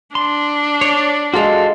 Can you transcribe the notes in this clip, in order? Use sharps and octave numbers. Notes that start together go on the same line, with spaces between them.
D4 C6
C#5 D5
G#3 F4 F#4 A4 F5